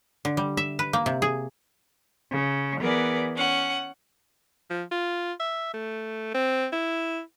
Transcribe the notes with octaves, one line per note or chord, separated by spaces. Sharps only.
D3
G3
E5
B4
A#3
C3
G#4
C#3
E3 B3 G#4 A#4 B4 D5
C#4 F#5
F3
F4
E5
A3
C4
E4